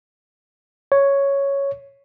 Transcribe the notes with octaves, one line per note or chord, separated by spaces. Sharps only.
C#5